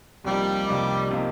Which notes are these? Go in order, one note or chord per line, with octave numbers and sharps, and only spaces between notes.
C2 C3 F3 G3 A#3 D#4
C2 C3 F3 A#3 D#4
C3 F3 A#3 D#4